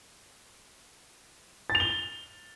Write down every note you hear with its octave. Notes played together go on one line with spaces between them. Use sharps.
A6
F7
G7